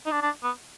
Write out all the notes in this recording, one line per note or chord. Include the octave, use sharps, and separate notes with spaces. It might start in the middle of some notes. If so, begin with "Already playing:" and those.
D#4
D4
D4
B3